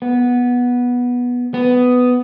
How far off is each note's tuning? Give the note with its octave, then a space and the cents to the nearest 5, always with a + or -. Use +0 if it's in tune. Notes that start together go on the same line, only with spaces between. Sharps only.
B3 -10
B3 +10